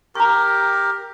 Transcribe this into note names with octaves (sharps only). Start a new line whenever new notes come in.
G4 A#4 A#5 C#6